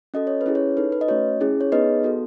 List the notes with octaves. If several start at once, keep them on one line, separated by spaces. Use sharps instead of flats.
C#4 F#4 A4 D#5
C#5
B4
C#4 E4 G#4
C#5
D#4 A4 B4
B4
D#5
A3 C#4 F#4 C#5
C#4 E4 G#4
C#5
B3 D#4 G#4 B4 D#5
B3 F#4 A4